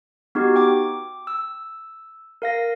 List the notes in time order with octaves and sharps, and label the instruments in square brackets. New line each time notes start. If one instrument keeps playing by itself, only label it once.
[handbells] B3 D#4 F#4 G4
G5 D6
E6
A#4 F5 A#6